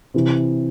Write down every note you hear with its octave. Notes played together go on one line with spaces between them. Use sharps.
C3 E3